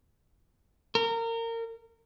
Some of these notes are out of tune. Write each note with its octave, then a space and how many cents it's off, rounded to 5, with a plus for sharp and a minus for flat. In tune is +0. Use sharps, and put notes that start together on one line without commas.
A#4 -25